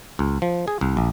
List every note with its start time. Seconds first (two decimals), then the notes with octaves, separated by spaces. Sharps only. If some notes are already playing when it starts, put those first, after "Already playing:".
0.19 C#2
0.42 F3
0.68 G#4
0.81 C2
0.97 A#1